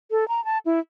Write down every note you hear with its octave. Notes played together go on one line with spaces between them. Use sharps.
A4
A#5
A5
E4